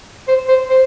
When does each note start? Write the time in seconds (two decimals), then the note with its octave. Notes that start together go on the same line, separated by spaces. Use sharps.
0.28 C5
0.48 C5
0.70 C5